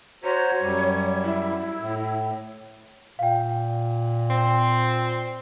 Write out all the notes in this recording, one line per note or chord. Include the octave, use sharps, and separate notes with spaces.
F#4 C5 C#5 A#5
F#2 G3
E4
A2
A#2 F5 G5
C4